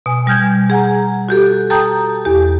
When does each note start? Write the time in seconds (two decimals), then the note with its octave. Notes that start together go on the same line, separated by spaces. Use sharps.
0.06 B2 G#5
0.26 B2 G3 G#5 F6 G6 G#6
0.70 G#4 F#5 G#5 A#5
1.29 F#4 G4 A4
1.70 A4 G5 A5 A#5 D#6 G6
2.25 E2 G4